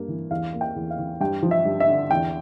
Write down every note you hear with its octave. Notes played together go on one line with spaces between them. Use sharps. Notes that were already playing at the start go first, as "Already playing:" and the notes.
Already playing: G2 A#3
E3
E2 F5
A#3
G5
E2
F5
E3
G2 G5
F3
E5
G2
E5
D3
E2 G5